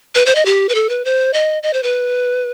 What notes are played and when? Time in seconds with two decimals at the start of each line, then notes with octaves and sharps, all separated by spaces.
0.15 B4
0.26 C5
0.35 D#5
0.45 G4
0.69 B4
0.75 A4
0.89 B4
1.05 C5
1.33 D#5
1.63 D#5
1.73 C5
1.83 B4